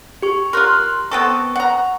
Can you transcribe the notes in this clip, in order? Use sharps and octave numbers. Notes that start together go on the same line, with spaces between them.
G4 C#6
F4 A#4 C6 F#6
B3 C4 A4 C#6
F#5 A#5